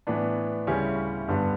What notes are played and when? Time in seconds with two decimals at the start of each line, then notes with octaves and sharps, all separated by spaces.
0.07 A2 E3 B3 D4
0.67 D2 C#3 G3 C#4 E4
1.28 G2 D3 G3 B3